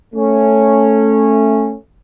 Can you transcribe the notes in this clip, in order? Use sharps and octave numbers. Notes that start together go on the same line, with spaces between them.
A3 C#4